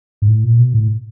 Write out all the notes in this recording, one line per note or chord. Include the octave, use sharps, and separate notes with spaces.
G#2
A2
A#2
B2
A2